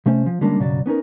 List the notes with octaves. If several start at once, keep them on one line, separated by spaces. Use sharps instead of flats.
C3 A3 C#4 C5
F3
D3 G3 G#3 A#3 C#4 D4
B1 G2 C#3 F#3 F#4 D5
B3 C#4 D#4 A#4